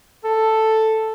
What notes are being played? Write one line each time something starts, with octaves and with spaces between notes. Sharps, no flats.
A4